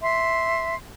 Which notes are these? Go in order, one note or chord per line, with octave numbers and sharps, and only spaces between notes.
E5 C6